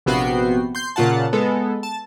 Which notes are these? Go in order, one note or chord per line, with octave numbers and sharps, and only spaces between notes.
A#1 C3 B3 F#4 G5 C7
C6 G6
A#2 C#3 F4 F#5 A5
G#3 B3 A4
A5